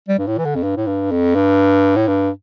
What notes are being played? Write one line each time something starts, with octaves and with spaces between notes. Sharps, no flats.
G3
G2
A2
E3
D3
F2
G2
A2
G2
F2
G2
A2
G2